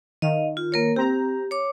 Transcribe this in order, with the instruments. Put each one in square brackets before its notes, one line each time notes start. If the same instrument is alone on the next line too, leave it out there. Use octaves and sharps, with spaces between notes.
[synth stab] D#3 [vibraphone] D#5 F5
[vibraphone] F4
A#3 A#4 C#5
[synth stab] C4 A#5 [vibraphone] G4
[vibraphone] C#5 D6